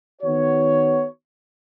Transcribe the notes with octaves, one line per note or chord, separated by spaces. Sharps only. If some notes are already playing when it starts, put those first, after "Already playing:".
D#3 B3 F#4 C#5